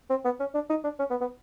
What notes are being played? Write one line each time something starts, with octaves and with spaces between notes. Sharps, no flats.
C4
B3
C#4
D4
D#4
D4
C#4
B3
B3